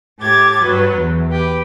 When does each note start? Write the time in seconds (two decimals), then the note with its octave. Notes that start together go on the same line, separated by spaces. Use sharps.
0.19 A2 G4 D6 G#6 A6
0.62 G2 F#3 F#4 B4
0.94 E2
1.31 G4 B4